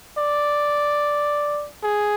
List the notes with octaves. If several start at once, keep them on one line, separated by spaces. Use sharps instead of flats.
D5
G#4